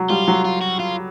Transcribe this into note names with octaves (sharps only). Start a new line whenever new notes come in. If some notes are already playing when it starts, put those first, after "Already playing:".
Already playing: F#3
G3 F4
F#3
F4
F#4
F4